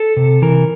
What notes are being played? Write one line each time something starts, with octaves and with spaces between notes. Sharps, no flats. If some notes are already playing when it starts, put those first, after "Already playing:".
Already playing: A4
C3
E3 A#4